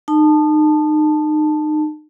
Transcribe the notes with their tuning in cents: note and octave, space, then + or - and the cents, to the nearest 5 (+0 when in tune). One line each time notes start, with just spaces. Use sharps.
D#4 -30 A5 +0